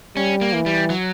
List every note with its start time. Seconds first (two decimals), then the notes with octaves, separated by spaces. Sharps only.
0.16 G3 C#4
0.42 A#3
0.53 E3
0.66 G3
0.90 F#3